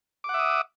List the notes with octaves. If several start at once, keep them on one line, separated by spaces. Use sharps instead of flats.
E5 F#5 D6 D#6